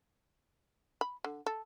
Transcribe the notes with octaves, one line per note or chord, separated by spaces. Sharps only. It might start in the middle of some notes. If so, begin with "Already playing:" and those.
B5
D3
A4